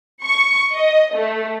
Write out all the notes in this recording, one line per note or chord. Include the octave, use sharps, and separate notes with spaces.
C#6
D#5
A3